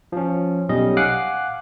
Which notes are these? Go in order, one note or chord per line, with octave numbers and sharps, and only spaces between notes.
F3 C#4
B1 G3 C#4 D#5
F5 F#5 G#5 D6 F#6 C7